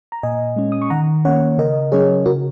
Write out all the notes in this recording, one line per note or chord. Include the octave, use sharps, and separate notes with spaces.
A#5
A#2 D#5 G#5
G#3 C#4
D#6
C#6
D#3 F#5 A#5
A#3 C#4 C#5 F#5
C#3 A#4 D#5
F#3 C#4 G#4 C#5
C#3 F#4 A#4